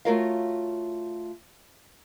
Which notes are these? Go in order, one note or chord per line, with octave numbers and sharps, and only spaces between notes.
A3 F4 F#4 A#4 C#5 F5